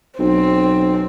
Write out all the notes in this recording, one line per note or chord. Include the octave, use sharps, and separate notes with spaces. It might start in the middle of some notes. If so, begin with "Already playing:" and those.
B1 C4